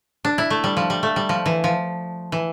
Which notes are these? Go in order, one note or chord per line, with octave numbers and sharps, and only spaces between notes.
D4
E4
A3
G3
F3
G3
A3
G3
F3
E3
F3
E3